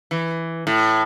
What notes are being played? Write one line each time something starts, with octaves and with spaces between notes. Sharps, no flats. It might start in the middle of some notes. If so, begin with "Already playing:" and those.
E3
A2